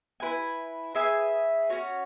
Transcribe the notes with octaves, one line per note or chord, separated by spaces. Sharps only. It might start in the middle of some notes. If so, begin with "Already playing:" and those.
E4 B4 G#5
G#4 B4 E5 G#5
C#4 F#4 C#5